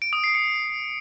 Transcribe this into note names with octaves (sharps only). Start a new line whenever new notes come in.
D7
D#6
C7
C#7